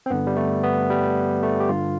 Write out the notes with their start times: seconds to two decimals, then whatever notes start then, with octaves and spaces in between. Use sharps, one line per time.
0.06 C4
0.10 G2 D3 B3
0.27 G3
0.37 A3
0.63 B3
0.90 G3
1.43 A3
1.60 G4
1.69 G2 D3 F4